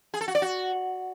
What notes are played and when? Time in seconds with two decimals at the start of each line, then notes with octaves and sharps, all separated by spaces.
0.14 G#4
0.21 A4
0.28 F#4
0.35 D5
0.42 F#4